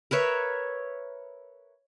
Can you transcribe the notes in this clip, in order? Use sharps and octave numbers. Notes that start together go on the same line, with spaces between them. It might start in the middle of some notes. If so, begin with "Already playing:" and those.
A#4 B4 C#5 E5